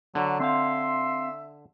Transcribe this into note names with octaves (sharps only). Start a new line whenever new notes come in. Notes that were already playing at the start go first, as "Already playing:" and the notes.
D3 F#3
C4 E5 F5 C6